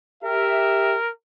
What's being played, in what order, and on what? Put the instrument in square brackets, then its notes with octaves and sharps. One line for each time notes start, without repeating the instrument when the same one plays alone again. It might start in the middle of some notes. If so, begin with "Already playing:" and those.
[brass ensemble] G4 E5 [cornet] A#4